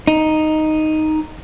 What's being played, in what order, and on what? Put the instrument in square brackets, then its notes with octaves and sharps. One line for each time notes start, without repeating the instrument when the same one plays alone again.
[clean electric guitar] D#4